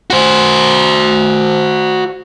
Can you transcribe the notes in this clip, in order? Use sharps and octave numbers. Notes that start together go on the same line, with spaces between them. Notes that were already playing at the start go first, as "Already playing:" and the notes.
F#4 C5